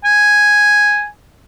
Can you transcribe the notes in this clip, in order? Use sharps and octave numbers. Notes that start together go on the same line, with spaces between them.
G#5